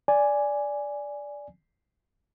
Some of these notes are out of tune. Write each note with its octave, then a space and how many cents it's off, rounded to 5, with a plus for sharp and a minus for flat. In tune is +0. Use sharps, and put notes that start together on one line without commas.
D5 -10 G#5 +0